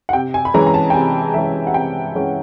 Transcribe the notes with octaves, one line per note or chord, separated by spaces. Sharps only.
F#5
C3 G5
G#5
B5
E3 G#3 C#4 A#5
A#5
A5
G5
C3 G#5
E3 G#3 C#4 E5
F#5
C3 G5
E3 G#3 C#4